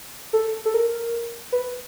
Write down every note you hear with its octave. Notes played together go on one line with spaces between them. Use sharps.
A4
A4
A#4
B4